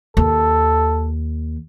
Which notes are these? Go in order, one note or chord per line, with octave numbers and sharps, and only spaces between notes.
D#2 A4